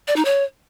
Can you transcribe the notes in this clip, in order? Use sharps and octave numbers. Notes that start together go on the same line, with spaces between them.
D5
D#4
C#5